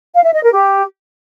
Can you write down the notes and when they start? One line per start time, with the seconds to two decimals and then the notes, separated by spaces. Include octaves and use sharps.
0.14 F5
0.24 E5
0.34 D#5
0.43 A#4
0.53 G4